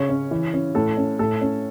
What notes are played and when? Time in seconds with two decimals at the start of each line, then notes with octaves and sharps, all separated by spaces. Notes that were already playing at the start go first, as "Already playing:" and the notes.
Already playing: C#3 C#5
0.09 C#4
0.31 E3
0.54 C#4
0.75 A2 A4
0.97 C#4
1.19 A2 A4
1.41 C#4